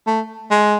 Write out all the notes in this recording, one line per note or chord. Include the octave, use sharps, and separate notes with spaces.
A3
G#3